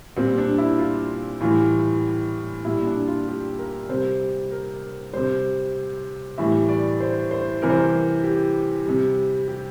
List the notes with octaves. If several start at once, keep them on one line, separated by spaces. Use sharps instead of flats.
A#2 G3 C4
D4
E4
F4
A2 E3 G3 F4
A#2 G3 E4
D4
F4
G4
A#4
C3 G3 C5
A#4
C3 G3 C5
A2 E3 G3 E5
D5
C5
C5
C3 E3 G3 A#4
C5
A#4
G4
C3 G3
G4